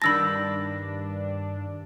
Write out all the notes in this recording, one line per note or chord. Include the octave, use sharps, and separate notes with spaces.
G2 D#3 D4 A5 B5 E6 A#6